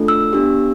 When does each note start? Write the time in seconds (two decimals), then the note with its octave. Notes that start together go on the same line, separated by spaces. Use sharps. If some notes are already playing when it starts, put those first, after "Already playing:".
Already playing: A3 D4 F4 A4
0.08 E6
0.33 B3 D4 G4